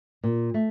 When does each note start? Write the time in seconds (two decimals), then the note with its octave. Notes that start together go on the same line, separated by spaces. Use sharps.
0.23 A#2
0.54 A3